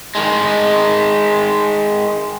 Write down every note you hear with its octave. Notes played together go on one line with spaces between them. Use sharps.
D#3 G#3